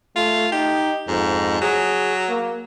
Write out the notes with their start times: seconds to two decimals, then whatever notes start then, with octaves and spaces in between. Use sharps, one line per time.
0.16 A3 F4
0.52 D#4 G4
1.08 F2 G#2
1.61 F#3 G#4
2.29 A#3